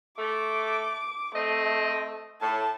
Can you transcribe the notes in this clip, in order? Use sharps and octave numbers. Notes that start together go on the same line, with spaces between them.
A3 D6
A3 C4 D#5
A2 A5